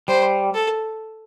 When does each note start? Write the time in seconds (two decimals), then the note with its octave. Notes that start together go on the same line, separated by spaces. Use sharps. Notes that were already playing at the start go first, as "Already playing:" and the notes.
0.08 G3 C5
0.54 A4